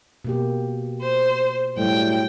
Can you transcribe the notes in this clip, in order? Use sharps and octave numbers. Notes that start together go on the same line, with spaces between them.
B2 A#3 G4
C5
A2 F#3 G3 G5